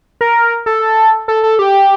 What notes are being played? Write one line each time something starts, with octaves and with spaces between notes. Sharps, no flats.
A#4
A4
A4
A4
G4